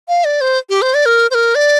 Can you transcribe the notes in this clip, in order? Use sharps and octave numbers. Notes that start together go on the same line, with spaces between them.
F5
D5
C5
G4
C5
D5
A#4
C5
A#4
D5